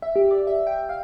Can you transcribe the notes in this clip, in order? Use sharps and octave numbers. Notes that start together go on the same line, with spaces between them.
E5
G4
D5
E5
G5
F5